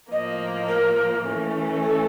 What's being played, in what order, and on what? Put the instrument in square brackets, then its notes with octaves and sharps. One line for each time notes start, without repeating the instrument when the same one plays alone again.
[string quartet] A2 F3 A#3 [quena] D#5
[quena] A#4
[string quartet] E3 A3 C#4
[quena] A4